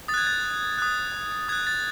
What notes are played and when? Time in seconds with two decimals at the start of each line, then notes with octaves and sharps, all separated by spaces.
0.08 D#6 A6
0.14 F#6 G#6
0.27 A6
0.78 D#6 F#6
1.48 D#6 F#6 G#6
1.67 A6